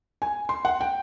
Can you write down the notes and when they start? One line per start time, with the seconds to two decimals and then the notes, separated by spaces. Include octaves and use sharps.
0.22 G#5
0.49 C6
0.65 F#5
0.81 G5